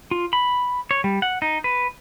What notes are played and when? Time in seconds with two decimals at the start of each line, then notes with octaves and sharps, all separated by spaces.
0.11 F4
0.33 B5
0.91 C#5
1.04 G3
1.22 F#5
1.42 D#4
1.64 B4